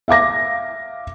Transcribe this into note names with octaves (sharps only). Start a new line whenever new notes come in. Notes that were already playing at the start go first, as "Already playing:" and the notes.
E5 F5 D6 A#6